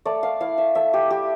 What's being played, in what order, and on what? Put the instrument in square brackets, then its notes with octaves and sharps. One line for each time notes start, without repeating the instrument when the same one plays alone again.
[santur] A3 D5
F5
E4 F5
E5
A3 E5
G4
E4 G4